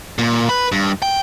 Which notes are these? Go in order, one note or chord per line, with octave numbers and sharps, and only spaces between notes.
A#2
B4
G2
G5